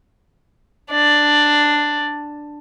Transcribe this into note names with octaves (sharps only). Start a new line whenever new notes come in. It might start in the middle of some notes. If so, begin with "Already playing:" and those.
D4 D5